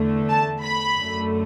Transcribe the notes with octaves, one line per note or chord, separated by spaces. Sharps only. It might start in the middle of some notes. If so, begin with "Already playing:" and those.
Already playing: E2 D3 A3
A5
B5
F#2 D3 A3